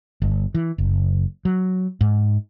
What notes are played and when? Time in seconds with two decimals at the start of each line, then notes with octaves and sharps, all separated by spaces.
0.22 G1
0.55 E3
0.78 F#1
1.45 F#3
2.01 G#2